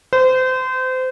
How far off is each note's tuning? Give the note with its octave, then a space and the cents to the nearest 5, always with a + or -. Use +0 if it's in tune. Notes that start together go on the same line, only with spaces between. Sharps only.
C5 -30